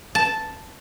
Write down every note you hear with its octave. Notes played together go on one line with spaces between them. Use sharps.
A5